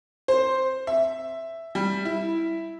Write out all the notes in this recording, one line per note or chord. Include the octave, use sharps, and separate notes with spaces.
C5
E5
G3
E4